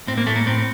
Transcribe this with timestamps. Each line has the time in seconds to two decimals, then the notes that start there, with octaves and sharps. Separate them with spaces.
0.07 A2 C4
0.18 A#3
0.27 A2 A3
0.36 A#3
0.46 A2 C4